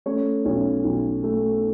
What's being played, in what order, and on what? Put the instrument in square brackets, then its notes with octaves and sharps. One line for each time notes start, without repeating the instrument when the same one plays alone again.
[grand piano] A3 C#4 C#5
B1 C#4 C#5
B1
A3